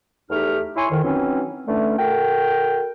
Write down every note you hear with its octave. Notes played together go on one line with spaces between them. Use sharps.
E2 A3 D#4 G4 F6
E4 C#5 G#5 C6 C#6
F2 D#3
E3 F#3 C4 C#4 D#4
D3 E3 A3 C#4 D4
F#4 A4 A#4 G5